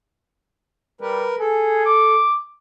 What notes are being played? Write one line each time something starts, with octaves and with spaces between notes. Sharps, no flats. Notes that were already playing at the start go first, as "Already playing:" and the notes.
G3 A#4 B4
G#4 A4
D6